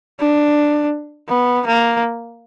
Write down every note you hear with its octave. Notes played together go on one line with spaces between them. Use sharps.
D4
B3
A#3